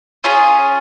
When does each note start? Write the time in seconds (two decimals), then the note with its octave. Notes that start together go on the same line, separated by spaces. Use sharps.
0.24 C#4 F4 G#4 C#5